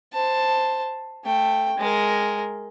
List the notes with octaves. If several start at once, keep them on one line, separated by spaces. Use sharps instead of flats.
C5 A5
A3 G5
G#3 A#4